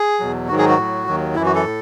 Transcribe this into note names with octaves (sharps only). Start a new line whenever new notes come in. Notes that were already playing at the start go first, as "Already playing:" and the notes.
Already playing: G#4
E2 B2 F#3
G#2 D#3 F#3 F#4
G#4
F#4
A2 F#3
D#2 D#3 F#3
F#2 E3 E4
F#4
A4
A2